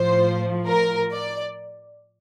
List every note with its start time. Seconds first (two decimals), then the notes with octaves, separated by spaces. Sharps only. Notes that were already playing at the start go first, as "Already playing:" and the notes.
Already playing: A2 F3 C5
0.67 A#4
1.12 D5